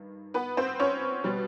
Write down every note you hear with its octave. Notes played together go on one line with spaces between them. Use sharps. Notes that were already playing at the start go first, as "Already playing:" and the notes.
Already playing: G2 D#3
B3 B4
C4 C5
C#4 C#5
B2 G3